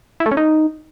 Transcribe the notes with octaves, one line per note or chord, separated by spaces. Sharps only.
E4
A3
C#4
D#4